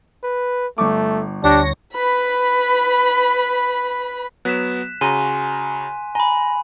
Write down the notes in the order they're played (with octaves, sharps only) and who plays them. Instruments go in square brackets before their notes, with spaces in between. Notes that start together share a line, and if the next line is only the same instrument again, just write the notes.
[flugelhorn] B4
[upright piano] G1 C#6 D6 [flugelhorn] A3
[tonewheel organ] D2 C#5 A#6 [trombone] D4 [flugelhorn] G4
[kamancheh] B4 B5
[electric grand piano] F#3 B3 [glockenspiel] F#6 B6 E7
[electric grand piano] C#3 F#4 A#5 [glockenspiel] G#5 C6 D#7
[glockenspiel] G#5 B5 [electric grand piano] A#5